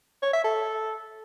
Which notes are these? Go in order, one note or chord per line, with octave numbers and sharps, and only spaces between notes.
C#5
E5
A4